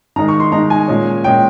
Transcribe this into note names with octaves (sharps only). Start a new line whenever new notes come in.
D#3 G#3 D#4 A#5
C#6
C6
D#3 G#3 D#4 A#5
G#5
A#2 G#3 C#4
A#2 G#3 C#4 G5